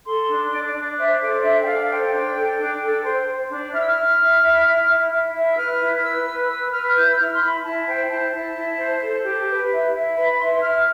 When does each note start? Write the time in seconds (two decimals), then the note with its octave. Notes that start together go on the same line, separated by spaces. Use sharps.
0.04 A4 C6
0.28 D4
0.50 D4 D5
0.67 D5
0.74 D4
0.97 C5 E5
1.20 A4 D5
1.42 D4 E5
1.60 G5
1.65 A4 F5
1.88 C5 G5
2.12 D4
2.34 A4
2.58 D4
2.81 A4
3.03 C5
3.27 C5
3.49 D4
3.72 E4 F6
3.79 E6
3.87 F6
3.95 E4
4.18 E4
4.41 E4
4.64 E4
4.87 E4
5.10 E4
5.33 E4
5.52 E6
5.56 B4 F6
5.79 E4
6.02 B4 E6
6.25 B4
6.48 B4 E6
6.71 B4 F6
6.94 E4 G6
7.11 E6
7.17 E4 F6
7.34 C6
7.39 E4 B5
7.63 E4 A5
7.87 C5 G5
8.09 E4 A5
8.32 E4
8.55 E4
8.77 C5
9.01 A4
9.24 G4
9.47 B4
9.70 E4
9.93 E4
10.16 B4 B5
10.38 E4 C6
10.62 E4 F6